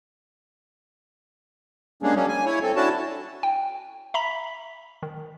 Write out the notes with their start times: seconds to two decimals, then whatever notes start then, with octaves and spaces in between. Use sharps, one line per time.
2.03 G3 G#3 A#3 C#4 D4 G#4
2.15 F#3 G3 A#3 C#4
2.28 G#5
2.45 E4 C#5
2.62 C4 A4
2.76 C#4 D4 E4 F#4 A5
3.43 G5
4.14 E5 A#5 B5 B6
5.03 D#3